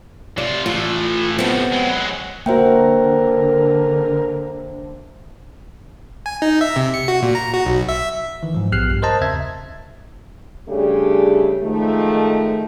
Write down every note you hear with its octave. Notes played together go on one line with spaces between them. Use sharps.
C3 F4 D5
A2 E3 F4
A2 C3 B3 C4
F#3 G#3
D3 A#3 F#4 A#4 C5 E5 G5
G#5
D#4
E5
C3
C#7
F#4
A#2
A#5
F#4
B1
E5
D#3 E3
G#2 F3
A#1 B3 G4 F6 F#6 C7
G2
A#4 C5 D#5 A5 A#5
D#2 C#3 C4 E5 G#6
C#3 G3 A3 D4 G4 G#4
D#3 F3 G#3 A3